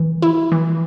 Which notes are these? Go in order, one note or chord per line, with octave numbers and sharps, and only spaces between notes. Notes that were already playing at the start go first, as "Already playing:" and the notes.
Already playing: E3
E4
E3